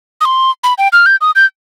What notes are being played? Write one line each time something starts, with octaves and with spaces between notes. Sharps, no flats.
D#6
C6
B5
G5
F6
G6
D#6
G6